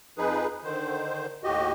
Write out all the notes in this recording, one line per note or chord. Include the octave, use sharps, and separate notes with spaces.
F2 F3 D#4 G#4 B4
D3 D#3 C5
D#2 A2 F#4 G4 D#5